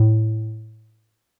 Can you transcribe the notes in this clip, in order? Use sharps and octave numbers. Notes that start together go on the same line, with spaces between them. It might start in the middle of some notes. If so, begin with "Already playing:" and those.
Already playing: A2